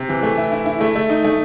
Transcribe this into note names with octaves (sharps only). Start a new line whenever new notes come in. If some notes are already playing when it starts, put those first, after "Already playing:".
Already playing: C3
E3
A3
E4
E4
E4
A3
A3
D#4
A3